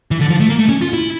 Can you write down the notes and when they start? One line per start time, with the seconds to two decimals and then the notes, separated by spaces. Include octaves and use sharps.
0.11 E3
0.21 D3
0.30 F3
0.40 A3
0.49 A#3
0.59 A3
0.69 C#4
0.82 F4
0.93 E4